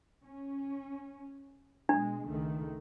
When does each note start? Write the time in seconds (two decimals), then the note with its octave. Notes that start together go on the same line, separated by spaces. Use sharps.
0.23 C#4
1.89 B2 G#3 D4
2.26 C#2 D#3 A3